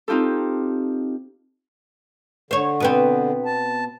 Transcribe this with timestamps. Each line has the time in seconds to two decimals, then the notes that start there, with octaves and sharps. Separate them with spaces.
0.08 C4 D#4 F4 G4 A4
2.51 D3 C5 C#5
2.80 B2 B3 C4
3.45 A5